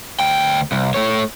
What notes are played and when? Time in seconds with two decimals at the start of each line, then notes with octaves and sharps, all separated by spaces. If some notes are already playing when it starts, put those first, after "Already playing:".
0.20 D2 G5
0.72 C2
0.94 A3 C#5